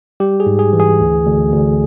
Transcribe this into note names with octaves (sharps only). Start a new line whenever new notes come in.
G3 G4
G#4
G#2
G#4
E3
G#4
D2
D2
D2